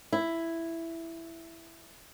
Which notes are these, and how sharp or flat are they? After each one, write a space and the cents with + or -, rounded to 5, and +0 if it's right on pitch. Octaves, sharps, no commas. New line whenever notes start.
E4 +5